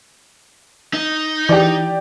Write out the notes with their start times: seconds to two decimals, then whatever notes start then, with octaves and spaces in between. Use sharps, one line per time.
0.93 D#4
1.49 E3 G4 D5